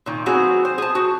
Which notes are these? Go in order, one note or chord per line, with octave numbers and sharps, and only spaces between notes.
A#2 D#3
F#3 B3 C4 F#4 G#4
C5
G#4 A5
F#4